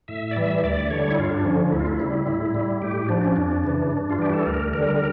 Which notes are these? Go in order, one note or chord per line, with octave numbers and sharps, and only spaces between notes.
A2 E5
D5
E3 G3 E5
D2 D5
D3 G3 C#5
E4
G2 F4
D4
D3 F3 C#4
D2 E4
F4
E4
C#3 G3
A2
G3
A2 G4
F3 D4
C#4
F2 D4
C#3 E3
G2
F4
E3 G3 G4
A4
D2 A#4
D3 G3 A#4